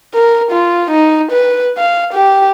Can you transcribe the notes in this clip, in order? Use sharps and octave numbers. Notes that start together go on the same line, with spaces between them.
A#4
F4
D#4
B4
F5
G4